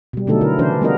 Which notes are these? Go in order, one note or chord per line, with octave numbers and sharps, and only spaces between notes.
B2 G3
B2 D3 F#3 A3 D#4 A4
D3 E4 A#4
C#3 E3 C#4 D4 E4 C5
G3 B3 D4 F4 A#4 D#5